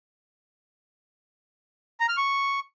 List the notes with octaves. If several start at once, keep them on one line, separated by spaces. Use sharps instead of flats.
A#5
F6
C#6